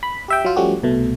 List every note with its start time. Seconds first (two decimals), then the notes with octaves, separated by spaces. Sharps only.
0.03 B5
0.28 G4 E5 G5
0.45 F#3 F4
0.56 F3 G3 A3 C#4 F#4 G4
0.83 C2 B2 A3